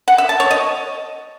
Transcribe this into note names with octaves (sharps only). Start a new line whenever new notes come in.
F#5
E5
A5
C#5
D#5